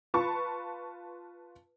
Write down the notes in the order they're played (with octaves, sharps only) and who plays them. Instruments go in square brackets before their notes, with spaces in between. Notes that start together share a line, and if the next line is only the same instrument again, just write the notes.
[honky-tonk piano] F4 B4 A5 C#6